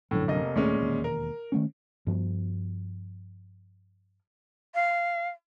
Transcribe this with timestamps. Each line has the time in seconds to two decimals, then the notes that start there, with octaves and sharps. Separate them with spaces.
0.11 A#1 F#2 A2 D3
0.28 F1 A#3 D#5
0.56 D#2 A#2 G#3 A3 C#4
0.80 E1 D#2
1.04 A#4
1.52 D#3 A3 C#4
2.07 G2 F3 B3
4.75 F5